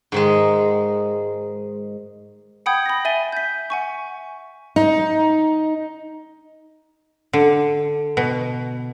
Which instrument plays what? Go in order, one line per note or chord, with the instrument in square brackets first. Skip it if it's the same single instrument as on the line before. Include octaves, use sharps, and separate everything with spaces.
[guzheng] G#2 D#3 G#3
[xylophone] F#5 G5 B5 D#6 G6 G#6
B5 A#6
E5 G#5 A6 D#7 G7
G6 B6
F#5 G#5 C#6
[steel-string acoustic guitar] D#4
[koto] D3
B2